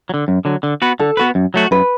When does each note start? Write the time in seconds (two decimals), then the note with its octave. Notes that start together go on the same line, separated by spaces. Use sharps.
0.09 F#3
0.14 D3
0.28 F#2
0.45 D3 F#3
0.63 D3
0.82 B3 F#4 B4
0.99 D3 A4
1.17 B3 F#4 B4
1.35 F#2
1.54 F#3 A3 F#4
1.71 F#2 B4